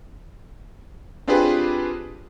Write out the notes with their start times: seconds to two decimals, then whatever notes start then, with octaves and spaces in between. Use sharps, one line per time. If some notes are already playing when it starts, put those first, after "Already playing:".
1.27 C4 D4 F4 G4 G#4 B4